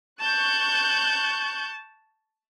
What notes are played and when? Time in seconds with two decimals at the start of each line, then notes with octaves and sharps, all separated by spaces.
0.20 A5 C#6 F#6 G6